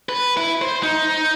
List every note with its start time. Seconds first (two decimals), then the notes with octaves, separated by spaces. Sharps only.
0.09 B4
0.37 E4
0.62 C5
0.83 D#4